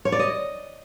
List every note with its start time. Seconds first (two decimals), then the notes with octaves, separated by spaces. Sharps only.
0.05 C#5
0.12 D5
0.19 D#5